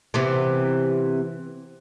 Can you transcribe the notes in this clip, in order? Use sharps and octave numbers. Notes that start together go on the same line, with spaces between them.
C3 E3 B3